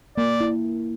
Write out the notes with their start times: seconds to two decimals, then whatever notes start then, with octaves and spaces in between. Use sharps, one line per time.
0.17 A#3 D5
0.40 E4